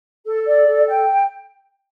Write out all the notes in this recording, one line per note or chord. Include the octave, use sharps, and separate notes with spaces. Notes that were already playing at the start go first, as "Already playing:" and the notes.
A4
D5
A4
G5